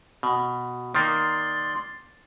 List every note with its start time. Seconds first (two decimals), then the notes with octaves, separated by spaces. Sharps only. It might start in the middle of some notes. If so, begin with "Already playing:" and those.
0.23 B2
0.95 D#3 A#3 D5 C6